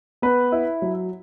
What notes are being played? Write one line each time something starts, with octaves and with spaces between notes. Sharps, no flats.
B3 B4
E4
F#3